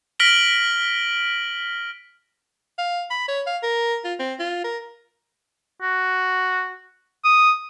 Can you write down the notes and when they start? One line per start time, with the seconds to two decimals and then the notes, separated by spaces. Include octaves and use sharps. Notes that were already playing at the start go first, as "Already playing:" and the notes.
0.20 F6 A#6 B6 D7 F#7 G7
2.78 F5
3.10 B5
3.28 C#5
3.47 F5
3.63 A#4
4.04 F4
4.19 C4
4.40 F4
4.64 A#4
5.82 F#4
7.25 D#6